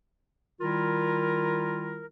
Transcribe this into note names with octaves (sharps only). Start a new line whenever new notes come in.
D#3 G3 E4 F4 A#4